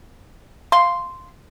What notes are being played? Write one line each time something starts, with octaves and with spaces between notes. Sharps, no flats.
F5 C6